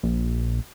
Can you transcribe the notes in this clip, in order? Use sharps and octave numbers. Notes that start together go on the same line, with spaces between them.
A#1